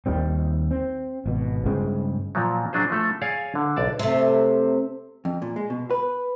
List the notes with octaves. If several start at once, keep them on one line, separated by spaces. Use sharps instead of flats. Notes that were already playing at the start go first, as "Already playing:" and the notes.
D#2 D#3 G3 C4
C4
G#1 B2
G2 C#3 G#3 C4
A#2 F3 F#3
F#3 D4 G#4 C5
F3 A3 A4
G#4 C#5 D5 F5 G#5
D3
B1 D5 A5
C3 A3
F2
A#2
G#3
B2
B4